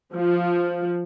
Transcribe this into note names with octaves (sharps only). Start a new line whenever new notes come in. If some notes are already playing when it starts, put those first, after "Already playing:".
F3